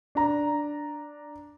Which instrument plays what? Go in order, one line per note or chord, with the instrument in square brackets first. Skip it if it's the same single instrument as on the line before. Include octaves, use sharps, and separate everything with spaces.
[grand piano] D4 A#5